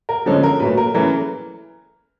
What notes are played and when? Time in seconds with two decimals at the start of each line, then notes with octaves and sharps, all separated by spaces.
0.09 A#4
0.26 D3 F3 G#3 C#4 A4
0.43 A#4
0.60 A#2 F#3 A3 B4
0.77 A#4
0.94 C#3 E3 A3 A#4